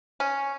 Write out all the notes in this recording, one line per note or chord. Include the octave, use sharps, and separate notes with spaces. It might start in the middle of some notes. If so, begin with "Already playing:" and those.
C#4